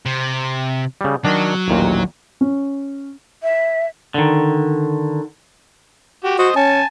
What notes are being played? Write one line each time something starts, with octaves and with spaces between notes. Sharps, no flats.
C3
C#3 G3
D#3 F#3 D4
A1 D#2 A#2
C#4
E5
D3 D#3
F#4 G4
F#4 C5 D#5
C#4 G#5 A5